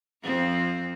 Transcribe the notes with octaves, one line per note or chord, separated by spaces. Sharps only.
F2 F3 C4